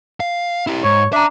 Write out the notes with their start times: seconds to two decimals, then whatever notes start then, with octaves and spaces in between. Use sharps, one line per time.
0.20 F5
0.67 E4 G4
0.84 G#2 C#5
1.13 D4 E5 A#5